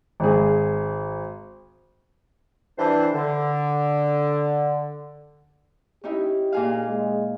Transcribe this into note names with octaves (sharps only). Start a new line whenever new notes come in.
G#1 G#4
E3 G3 D4 C5
D3
C#4 D#4 E4 G4
A#2 G#4 F5
G#3